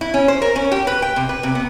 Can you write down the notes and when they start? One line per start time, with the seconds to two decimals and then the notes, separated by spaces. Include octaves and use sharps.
0.01 E4
0.14 C#4
0.28 C5
0.42 A#4
0.56 C#4
0.72 G4
0.87 B4
1.02 G5
1.16 C3
1.29 B4
1.43 C3
1.55 B3